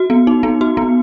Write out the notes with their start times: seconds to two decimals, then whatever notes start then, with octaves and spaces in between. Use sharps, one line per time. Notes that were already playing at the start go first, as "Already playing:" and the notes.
Already playing: F#4
0.10 B3
0.27 D#4
0.43 B3
0.61 F#4
0.77 B3